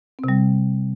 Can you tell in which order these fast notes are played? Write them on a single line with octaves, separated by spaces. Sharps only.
C4 C3 G3